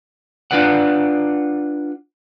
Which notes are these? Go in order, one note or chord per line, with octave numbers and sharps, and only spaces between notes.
D4 F4 B4 D5 F#5